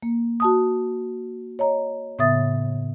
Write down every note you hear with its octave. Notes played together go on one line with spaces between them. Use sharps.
A#3
F#4 A5 D#6
C#5 D#5 A#5
A2 C#3 B3 E5 D#6 A6